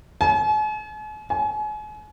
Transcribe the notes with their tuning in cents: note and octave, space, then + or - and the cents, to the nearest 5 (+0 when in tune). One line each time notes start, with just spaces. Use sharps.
G#5 +45
G#5 +35